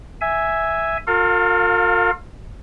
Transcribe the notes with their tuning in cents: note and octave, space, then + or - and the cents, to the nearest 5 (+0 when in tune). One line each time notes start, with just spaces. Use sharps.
E5 +0 G#5 +0
F4 +40 A#4 -45 F5 +15